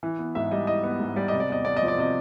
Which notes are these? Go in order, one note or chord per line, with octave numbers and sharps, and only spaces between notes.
E3
B3
G#2 E5
G3 D#5
E3 D#5
B3
G#2
G3 D5
C3 D#5
D5
E2 D#5
E2 D5
D#5
F3
D5
C3 D#5